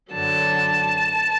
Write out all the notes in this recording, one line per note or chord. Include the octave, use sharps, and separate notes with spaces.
F#2 D3 F#3 A5